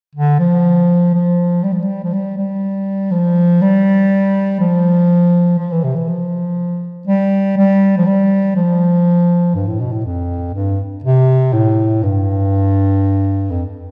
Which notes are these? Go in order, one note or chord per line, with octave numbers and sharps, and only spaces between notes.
D3
F3
F3
G3
F3
G3
F3
G3
G3
F3
G3
F3
F3
E3
C3
E3
F3
G3
G3
F3
G3
F3
G2
A2
B2
A2
F2
G2
C3
A2
G2
F2